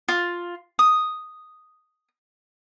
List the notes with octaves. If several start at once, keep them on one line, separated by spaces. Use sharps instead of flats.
F4
D#6